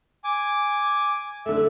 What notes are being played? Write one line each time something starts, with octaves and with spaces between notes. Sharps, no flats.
G#5 D6
D3 A3 E5 E6